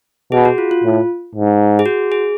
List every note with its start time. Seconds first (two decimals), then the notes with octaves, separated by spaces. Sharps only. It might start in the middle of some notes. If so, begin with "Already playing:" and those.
0.32 B2 G#4
0.45 F#4
0.58 F4
0.71 F4
0.84 A2
1.35 G#2
1.79 G#4
1.86 F#4
2.12 G#4